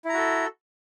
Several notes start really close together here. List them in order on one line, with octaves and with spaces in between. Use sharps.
E4 A#5 F#4 A4